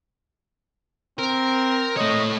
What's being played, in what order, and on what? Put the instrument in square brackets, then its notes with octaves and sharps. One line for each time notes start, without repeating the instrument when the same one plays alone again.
[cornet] C4 [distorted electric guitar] A#4
[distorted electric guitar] A3 C#5 [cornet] D#5